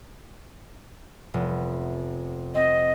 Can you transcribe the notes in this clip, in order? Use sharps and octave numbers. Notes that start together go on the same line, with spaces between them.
F1 B3
C4 D#5